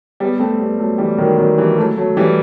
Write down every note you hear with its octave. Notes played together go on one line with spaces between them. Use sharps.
G3 B3
A3 C4
G3 B3
F#3 A3
E3 G3
D#3 F#3
D#3 F#3
E3 G3
F#3 A3
F#3 A3
E3 G3